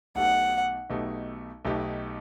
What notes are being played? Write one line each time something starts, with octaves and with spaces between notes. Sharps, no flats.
B1 B2 A3 D#4 G4 F#5
B1 B2 A3 D#4 G4
B1 B2 A3 D#4 G4